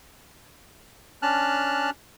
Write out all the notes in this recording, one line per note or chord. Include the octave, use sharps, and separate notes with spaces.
C#4 D4 A5 F6 F#6